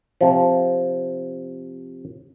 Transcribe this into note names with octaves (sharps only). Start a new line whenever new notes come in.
C3 F3